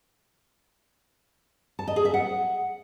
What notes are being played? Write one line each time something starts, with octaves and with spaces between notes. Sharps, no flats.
A5
D#5
G#4
E5
F#5